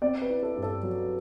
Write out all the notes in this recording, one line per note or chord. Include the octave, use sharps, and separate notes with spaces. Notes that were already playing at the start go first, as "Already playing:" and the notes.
C4 D5
B4
E4
A4
G2
A4
F#3